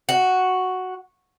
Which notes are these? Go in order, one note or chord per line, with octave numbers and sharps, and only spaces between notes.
F#4